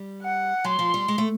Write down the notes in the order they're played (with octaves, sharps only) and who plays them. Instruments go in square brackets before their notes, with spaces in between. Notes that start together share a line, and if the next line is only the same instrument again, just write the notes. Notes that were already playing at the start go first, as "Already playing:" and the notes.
Already playing: [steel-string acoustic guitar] G3
[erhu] F#5
[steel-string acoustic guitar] F#3 [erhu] C6
[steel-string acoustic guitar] F3
G3
G#3
A3